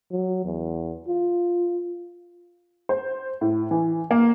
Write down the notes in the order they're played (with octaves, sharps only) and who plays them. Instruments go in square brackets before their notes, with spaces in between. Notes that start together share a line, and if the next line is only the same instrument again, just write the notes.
[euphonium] F#3
E2
F4
[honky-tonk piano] C5
A2
E3
A#3